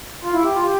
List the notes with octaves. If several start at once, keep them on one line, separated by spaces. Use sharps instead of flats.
F4
E4
G4
F4
G4